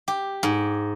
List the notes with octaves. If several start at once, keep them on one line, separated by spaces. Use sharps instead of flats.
G4
G#2